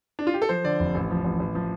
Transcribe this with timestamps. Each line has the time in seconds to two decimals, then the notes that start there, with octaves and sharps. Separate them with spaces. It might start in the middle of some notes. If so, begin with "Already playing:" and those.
0.19 D4
0.27 F4
0.34 G4
0.42 A4
0.49 F3 C5
0.64 D3 D5
0.80 F1
0.95 A1
1.10 F3
1.24 A1
1.40 A1
1.55 F3